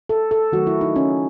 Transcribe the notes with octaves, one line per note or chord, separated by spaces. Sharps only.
A4
A4
D#3 F#3 A3 F#4
E4
D#4
C#4